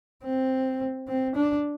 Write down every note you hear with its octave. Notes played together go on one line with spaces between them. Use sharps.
C4
C4
D4